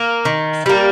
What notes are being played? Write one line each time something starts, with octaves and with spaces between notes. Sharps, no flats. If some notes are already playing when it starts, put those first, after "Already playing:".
Already playing: A#3
D#3
G3 A#3